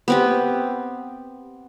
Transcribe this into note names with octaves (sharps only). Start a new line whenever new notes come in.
B3 C4 G4